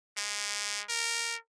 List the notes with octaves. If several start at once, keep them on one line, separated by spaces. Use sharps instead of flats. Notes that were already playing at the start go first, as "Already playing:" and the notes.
G#3
A#4